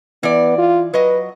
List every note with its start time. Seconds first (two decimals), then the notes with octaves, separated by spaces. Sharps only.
0.23 E3 B3 D5
0.58 F4
0.94 F#3 B4 D#5